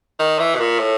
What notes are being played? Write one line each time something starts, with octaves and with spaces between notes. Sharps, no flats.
D#3
E3
B2
A#2
A2